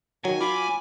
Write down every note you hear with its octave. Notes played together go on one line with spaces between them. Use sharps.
D#3 F#3 G#5
F4 B5 D6